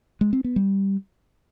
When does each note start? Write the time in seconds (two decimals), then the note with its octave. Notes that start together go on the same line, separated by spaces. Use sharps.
0.21 G#3
0.33 C4
0.44 B3
0.56 G3